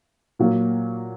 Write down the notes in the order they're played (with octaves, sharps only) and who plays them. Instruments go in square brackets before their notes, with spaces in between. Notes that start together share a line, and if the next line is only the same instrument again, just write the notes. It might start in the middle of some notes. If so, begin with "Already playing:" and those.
[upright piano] A#2 F#3 A#3